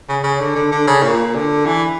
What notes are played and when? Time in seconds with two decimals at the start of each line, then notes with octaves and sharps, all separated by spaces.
0.09 C#3
0.23 C#3
0.40 D3
0.55 D3
0.72 D3
0.87 C#3
1.03 A#2
1.35 D3
1.66 E3